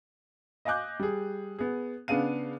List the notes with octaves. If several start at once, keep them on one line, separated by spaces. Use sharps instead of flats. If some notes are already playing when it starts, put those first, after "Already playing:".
D#5 F5 G#5 D6 F#6 G6
G3 G#4
B3 G#4
C#3 B3 D4 G#4 F5 D#7